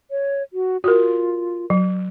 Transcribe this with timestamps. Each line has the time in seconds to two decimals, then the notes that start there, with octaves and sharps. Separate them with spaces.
0.11 C#5
0.53 F#4
0.84 F4 F#4 A#4
1.70 F#3